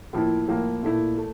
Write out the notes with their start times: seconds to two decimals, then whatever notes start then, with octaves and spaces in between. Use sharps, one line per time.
0.13 A2 F3 A#3 E4
0.48 A2 F3 A#3 E4
0.83 A#2 A3 E4
1.18 A3